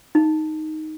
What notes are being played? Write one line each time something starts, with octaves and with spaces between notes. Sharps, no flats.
D#4